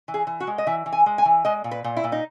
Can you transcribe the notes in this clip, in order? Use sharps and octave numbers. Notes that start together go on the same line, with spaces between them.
E3
G#4
E3
F#4
G#3
D#5
E3 E5
E3
G#5
G#3
G#5
E3
G#3 D#5
A#2
B4
A#2
E4
A#2
D#4